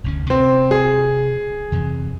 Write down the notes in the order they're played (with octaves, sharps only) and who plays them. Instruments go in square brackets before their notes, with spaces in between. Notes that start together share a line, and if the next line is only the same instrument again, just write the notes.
[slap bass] F1 D2 C#4
[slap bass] C3 [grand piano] C4
[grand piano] G#4
[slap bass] F2 C3 E3